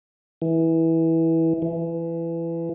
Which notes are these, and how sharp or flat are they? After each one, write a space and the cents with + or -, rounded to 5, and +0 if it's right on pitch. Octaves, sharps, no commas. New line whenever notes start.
E3 -15
E3 +20